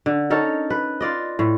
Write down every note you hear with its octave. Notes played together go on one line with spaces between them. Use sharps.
D3
C#4 D#4 A4 A#4
B4
F4 D5 D#5
A2